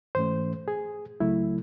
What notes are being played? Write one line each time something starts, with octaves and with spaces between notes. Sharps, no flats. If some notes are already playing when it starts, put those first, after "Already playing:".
G#2 E3 A3 C#4 C5
G#4
C#2 C#3 F#3 A3 E4